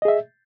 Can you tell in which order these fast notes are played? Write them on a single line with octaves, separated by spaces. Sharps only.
D#5 G#4 E5